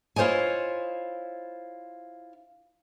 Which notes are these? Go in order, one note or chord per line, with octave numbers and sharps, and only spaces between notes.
E4 F4 C5 C#5 D#5 G#5